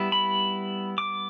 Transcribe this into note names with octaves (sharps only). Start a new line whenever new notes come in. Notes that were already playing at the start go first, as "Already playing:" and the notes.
Already playing: G3 B3 E4
B5
D6